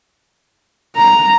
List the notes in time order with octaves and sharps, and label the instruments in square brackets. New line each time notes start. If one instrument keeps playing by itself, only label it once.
[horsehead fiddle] A#5